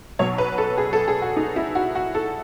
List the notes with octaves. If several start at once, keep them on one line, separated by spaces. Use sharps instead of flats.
B1 B2 F#3 C#5
B4
A4
G#4
A4
G#4
F#4
D#4
E4
F#4
F#4
A4